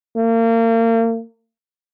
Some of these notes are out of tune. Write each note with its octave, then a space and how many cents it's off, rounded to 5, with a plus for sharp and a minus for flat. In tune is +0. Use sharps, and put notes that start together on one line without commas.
A#3 -35